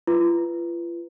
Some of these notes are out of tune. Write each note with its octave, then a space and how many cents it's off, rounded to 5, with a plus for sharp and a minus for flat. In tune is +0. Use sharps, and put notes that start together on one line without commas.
F4 -35 B4 +0